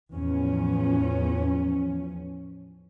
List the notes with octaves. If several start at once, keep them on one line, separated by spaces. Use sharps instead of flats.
E2 A2 F3 C#4